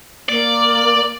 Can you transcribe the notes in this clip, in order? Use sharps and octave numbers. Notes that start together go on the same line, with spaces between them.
A#3 D5